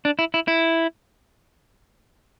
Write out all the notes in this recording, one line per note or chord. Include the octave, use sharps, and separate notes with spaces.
D4
E4
E4
E4